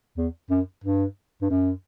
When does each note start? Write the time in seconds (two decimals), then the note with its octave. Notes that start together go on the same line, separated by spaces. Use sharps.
0.17 E2
0.50 F#2
0.84 G2
1.42 G2
1.51 F#2